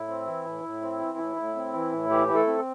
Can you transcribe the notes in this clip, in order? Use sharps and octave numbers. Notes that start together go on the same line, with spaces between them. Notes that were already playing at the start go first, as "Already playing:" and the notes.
Already playing: A2 E4
C4
E3
A2
A2
C4
E3
A2
A2
C4
E3
A2
E3 G4
E4
A3 A4
C4